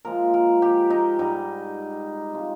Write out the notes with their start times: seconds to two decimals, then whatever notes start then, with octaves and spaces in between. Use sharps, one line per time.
0.05 A#2 F3 G#3 A#4
0.34 A#4
0.62 G4
0.90 D#4
1.19 G#2 G3 D#4
2.33 C3 F3 G#3